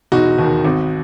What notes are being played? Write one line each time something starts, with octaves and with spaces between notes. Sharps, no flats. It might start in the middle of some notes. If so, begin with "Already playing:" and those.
E1 D#4 F#4
D#2 D#3
G#1